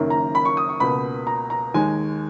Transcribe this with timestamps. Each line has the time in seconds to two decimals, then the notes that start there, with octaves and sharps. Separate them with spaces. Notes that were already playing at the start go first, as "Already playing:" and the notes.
Already playing: F#1 F#2 D#3 A#3
0.10 A#5
0.35 B5
0.45 C#6
0.57 D#6
0.69 C#6
0.80 C#2 B2 A#3 B5
1.27 A#5
1.50 A#5
1.74 D#2 D#3 G#3 G#5